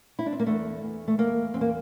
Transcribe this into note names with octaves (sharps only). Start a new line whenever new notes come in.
E4
D4
C4
A#3
E2 A3
E2
A3
E2 A#3
E2 C4
A#3